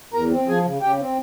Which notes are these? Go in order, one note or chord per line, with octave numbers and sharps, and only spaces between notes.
E2 A#4 A#5
C4
F3 G#4 G#5
C#3
C#3 G4 G5
C4